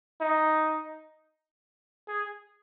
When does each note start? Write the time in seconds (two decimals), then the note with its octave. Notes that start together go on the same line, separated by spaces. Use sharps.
0.21 D#4
2.08 G#4